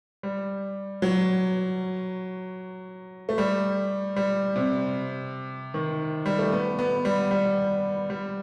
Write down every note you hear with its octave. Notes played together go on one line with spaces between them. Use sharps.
G3
F#3
A3
G3
G3
C3
D#3
G3
A3
B3
B3
G3
G3
G3